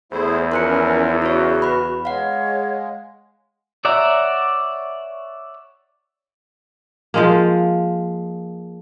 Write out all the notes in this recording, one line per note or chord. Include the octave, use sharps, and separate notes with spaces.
E2 A3 E4 G#4 C5
F3 C#4 E4 A#4 C6 F#6 C#7
C#3 E4 F#4 C#5
B4 B5
G#3 C#5 F5 F#5
C#5 D5 E5 F#5 A#5
F3 G#3 A#3